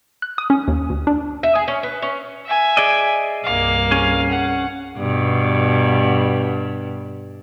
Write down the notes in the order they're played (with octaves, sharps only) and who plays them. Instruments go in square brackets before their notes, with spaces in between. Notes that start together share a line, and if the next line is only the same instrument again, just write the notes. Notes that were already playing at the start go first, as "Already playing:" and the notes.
[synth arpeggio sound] F#6
D#6
C#4
D#2
D2
D4
[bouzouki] E5
G#4
C#4
B4
C#4
[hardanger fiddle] E5 G#5
[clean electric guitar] G#4 D5 D#5
[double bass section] C2 G2 [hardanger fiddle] A#3 F5
[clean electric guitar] C#4 G#4
[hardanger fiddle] F#5
[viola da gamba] G2 B2